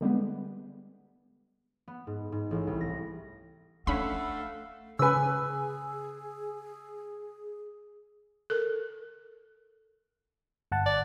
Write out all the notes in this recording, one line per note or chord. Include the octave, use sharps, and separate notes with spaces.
D3 G3 G#3 B3
B3
G#2
G#2
A1
C2
A#6
A3 C#4 D4 F5 F#5 B5 E6
C#3 G#4 B4 G#5 E6
A4 A#4
G1 F#5 A5
D5